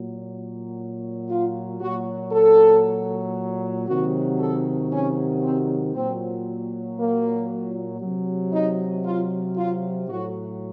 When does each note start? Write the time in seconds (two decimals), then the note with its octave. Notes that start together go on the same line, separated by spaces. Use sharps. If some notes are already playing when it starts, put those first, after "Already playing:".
Already playing: A#2 F#3
1.29 F4
1.80 A#2 F#3 F#4
2.32 A4
3.87 C3 D#3 F#3 F#4
4.39 A4
4.91 C#4
5.42 C4
5.94 A#2 F#3 C4
6.98 A#3
8.01 C3 F#3
8.53 D#4
9.05 F4
9.56 F4
10.08 A2 F#3 F#4